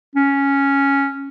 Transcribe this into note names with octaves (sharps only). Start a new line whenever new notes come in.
C#4